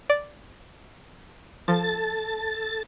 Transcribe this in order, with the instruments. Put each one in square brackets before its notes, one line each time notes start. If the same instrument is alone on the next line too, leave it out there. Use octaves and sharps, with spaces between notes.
[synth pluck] D5
[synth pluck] F3 [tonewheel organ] A4 A5 A6